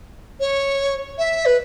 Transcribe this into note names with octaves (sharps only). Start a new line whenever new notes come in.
C#5
E5
B4